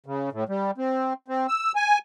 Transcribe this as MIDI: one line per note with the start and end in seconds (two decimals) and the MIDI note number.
0.06 0.30 49
0.32 0.44 45
0.49 0.71 55
0.78 1.13 60
1.28 1.47 60
1.48 1.72 88
1.76 1.98 80